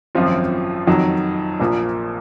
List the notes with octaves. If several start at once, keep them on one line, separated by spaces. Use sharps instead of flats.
G#1 F#2 F3 C4 F4
F2 D#3 F#3
A#1 A#2 F3 A#3